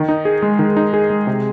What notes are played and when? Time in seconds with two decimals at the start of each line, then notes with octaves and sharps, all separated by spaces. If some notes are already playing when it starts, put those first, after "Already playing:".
Already playing: D#3
0.08 D#4
0.25 G#4
0.42 G#3
0.59 D#3
0.76 D#4
0.94 G#4
1.10 G#3
1.27 C3